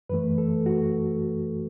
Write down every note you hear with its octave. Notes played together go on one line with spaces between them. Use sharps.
F#2 E3 A3 B4
A4
F#4